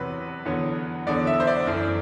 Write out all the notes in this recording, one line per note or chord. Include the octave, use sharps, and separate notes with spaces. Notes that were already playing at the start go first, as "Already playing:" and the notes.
Already playing: E2 C3 F#3 B4
E2 D3 F#3 B3
E2 D3 F#3 B3 D5
E5
C5
D5
F#2 E3 A3